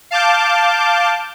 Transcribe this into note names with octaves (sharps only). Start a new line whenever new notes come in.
F5 A5 D6 G6